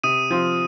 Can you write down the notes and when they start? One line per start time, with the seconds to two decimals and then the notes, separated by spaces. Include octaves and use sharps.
0.04 C3 D#6 D#7
0.30 F3 C4 F4